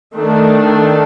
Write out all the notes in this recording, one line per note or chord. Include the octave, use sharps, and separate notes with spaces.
D#3 A3 D4